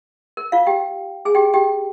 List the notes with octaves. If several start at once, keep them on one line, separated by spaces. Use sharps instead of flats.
A#4
F4 F5
G4 G5
G#4 G#5
G4 G5
G4 G5